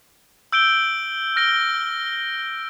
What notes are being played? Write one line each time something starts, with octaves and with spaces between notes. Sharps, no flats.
E6 G6 D7 G7
F6 A#6 D7 G7